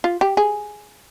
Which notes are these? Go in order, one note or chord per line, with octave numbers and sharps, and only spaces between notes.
F4
G4
G#4